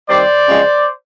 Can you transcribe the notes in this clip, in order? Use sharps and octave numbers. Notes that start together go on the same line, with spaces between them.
D#3 G3 C4 C5 D5
C#3 F3 G#3 C4